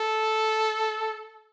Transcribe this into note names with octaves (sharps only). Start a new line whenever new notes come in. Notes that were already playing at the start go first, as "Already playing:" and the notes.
Already playing: A4